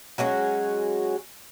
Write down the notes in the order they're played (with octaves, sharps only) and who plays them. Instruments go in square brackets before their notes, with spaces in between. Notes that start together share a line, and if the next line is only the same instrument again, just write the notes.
[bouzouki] F#3 G#3 C#4 F#4